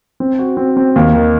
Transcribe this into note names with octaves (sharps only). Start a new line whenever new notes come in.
C4
F#4
C4
C4
D#2
D#3